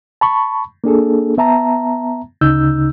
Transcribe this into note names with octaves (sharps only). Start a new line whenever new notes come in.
A5 B5 C#6
A#3 D4 G#4 A4
B3 E5 A5 A#5
D2 C#3 D#4 E6 G6